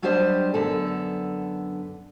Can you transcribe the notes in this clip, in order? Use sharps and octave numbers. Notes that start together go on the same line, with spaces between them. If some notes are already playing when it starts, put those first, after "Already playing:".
F#3 G3 D4 G4 C5 D#5
F#2 D3 B3 A4